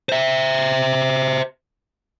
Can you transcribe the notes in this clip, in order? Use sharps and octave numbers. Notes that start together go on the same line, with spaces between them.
C5 E5